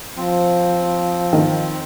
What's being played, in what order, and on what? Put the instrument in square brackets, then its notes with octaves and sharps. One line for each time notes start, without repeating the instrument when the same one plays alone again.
[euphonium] F3 [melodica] C4
[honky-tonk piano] D#3